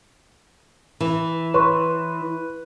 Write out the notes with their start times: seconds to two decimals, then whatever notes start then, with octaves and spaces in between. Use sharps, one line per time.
1.00 E3
1.54 B4 C#5 C6 C#6